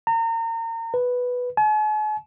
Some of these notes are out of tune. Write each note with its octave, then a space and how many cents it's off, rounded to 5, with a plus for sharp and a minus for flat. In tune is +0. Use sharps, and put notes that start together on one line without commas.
A#5 -35
B4 +0
G#5 +45